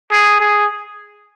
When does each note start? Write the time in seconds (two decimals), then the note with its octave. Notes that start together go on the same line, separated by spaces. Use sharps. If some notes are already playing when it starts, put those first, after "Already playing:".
0.11 G#4
0.40 G#4